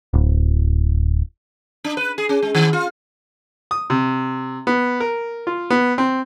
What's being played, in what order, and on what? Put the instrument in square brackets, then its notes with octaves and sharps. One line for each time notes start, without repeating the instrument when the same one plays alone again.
[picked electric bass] D1
[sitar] D4
B4
G#4
C#4
G#3
D#3
F4
[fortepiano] D#6
C3
B3
A#4
F4
B3
C4